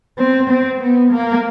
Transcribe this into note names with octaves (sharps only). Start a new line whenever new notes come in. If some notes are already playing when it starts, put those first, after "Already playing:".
C4
C4
B3
A#3